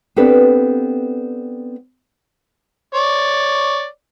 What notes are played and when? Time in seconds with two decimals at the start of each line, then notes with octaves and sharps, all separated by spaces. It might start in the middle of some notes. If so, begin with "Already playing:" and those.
0.16 B3 C4 D4 G4 A4 B4
2.95 C#5 D5